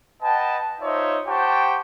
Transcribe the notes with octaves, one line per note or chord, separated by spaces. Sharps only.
B4 D#5 F#5 G5 A5
D#4 F4 C5 C#5 D#5 E5
G4 C5 F#5 G5 A5 C#6